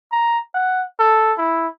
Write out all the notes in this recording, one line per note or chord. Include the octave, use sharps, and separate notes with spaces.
A#5
F#5
A4
E4